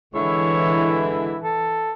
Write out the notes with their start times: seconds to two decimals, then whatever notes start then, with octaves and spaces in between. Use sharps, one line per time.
0.15 D3 E3 G#3 E4 C#5
1.44 A4